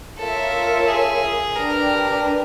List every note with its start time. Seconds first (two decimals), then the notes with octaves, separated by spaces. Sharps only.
0.18 F4 A4 A#4 C#5 E5
0.87 G#4
1.55 D4 G4 A#4 B4